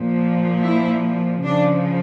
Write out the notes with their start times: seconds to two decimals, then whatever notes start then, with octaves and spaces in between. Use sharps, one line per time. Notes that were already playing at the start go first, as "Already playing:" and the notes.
Already playing: A#2 F3
0.63 E4
1.44 C#3 F3 D4